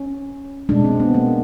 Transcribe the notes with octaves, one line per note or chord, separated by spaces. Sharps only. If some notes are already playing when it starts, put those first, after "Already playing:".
Already playing: C#4
B2 G#3 D4
C4
B3
A#3